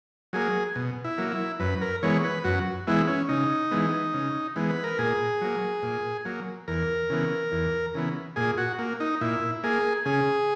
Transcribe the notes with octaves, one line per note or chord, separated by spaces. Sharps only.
F#3 A#3 G#4
B2
E4
F#3 A#3
E4
F#2 B4
A#4
E3 G#3 B3 C#5
B4
F#2 F#4
E3 G#3 B3 E4
C#4
C#3 D#4
E3 G#3 B3
C#3
E3 G#3 B3
B4
A#4
A#2 G#4
F#3 A#3
A#2
F#3 A#3
E2 A#4
C#3 E3 B3
E2
C#3 E3 B3
A#2 G#4
F#4
A#3
D#4
A#2 E4
A#3 G#4
C#3 G#4